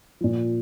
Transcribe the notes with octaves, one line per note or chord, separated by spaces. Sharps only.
A#2 F3